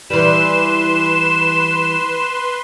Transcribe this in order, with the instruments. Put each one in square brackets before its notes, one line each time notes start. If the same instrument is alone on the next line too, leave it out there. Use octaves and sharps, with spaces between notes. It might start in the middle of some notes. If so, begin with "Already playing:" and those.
[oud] E3 G3 [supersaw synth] B4 C6 [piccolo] E7